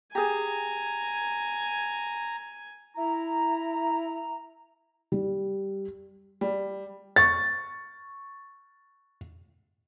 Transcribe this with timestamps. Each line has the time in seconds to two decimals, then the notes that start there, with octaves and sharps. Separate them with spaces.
0.15 G4 G#4 G#5 A#5
2.96 E4 A#5
5.12 G3
6.41 G3
7.16 C#6 A6